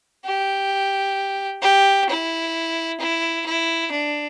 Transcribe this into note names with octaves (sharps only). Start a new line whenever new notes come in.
G4
G4
E4
E4
E4
D4